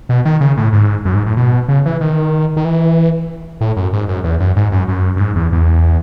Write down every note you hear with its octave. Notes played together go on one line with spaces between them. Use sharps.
B2
D#3
C#3
A2
G#2
F#2
G#2
A2
B2
C#3
E3
D#3
D#3
E3
A2
F#2
G#2
F#2
E2
F#2
G#2
F#2
F#2
F#2
G#2
E2
E2